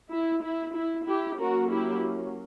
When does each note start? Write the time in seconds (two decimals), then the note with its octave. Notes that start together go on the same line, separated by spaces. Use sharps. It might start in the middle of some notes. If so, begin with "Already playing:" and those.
0.13 E4
0.44 E4
0.77 E4
1.08 E4 G4
1.40 F#3 A#3 C#4 F#4 A#4
1.71 E4 G4